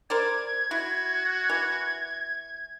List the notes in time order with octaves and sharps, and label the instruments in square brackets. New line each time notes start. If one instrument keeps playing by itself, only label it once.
[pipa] A#4 C5 D5 [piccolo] G#6
[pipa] E4 [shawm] F#4
[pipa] E3